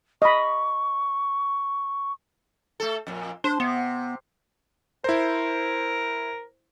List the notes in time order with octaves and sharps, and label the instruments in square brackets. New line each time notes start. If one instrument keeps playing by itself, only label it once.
[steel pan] D#5 B5 [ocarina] C#6
[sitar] A3 A4
F2 A#2
[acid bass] D4 [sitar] C5
[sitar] C3 [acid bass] B3
[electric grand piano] E4 C5 [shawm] A#4